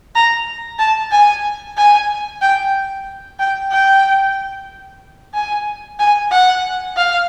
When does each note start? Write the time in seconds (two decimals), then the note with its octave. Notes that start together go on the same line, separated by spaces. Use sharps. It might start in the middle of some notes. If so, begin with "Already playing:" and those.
0.15 A#5
0.79 A5
1.11 G#5
1.77 G#5
2.41 G5
3.39 G5
3.71 G5
5.34 G#5
5.99 G#5
6.31 F#5
6.96 F5